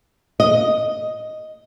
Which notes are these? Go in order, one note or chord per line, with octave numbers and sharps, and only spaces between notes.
D#5